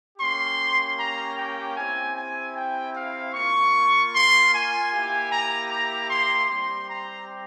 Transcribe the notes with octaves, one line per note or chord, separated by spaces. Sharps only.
A#3 C#4 G4 C6
A#5
G5
C4 E4 G4 G#5
G#5
G5
F5
A#3 F4 C#6
C6
G#5
A#3 E4 G4 G#5
A#5
A#5
C6
G3 C4 G4 C6
A#5